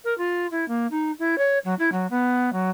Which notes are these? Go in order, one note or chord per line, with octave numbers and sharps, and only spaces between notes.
A#4
F4
E4
A#3
D#4
E4
C#5
F#3
E4
F#3
B3
F#3